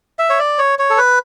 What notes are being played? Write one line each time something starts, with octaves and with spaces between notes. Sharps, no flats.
E5
C#5
D5
C#5
C#5
A4
B4